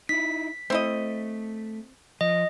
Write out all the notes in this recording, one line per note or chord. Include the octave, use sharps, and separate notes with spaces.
D#4 E4 B6
A3 C4 E4 D#5
F3 D#5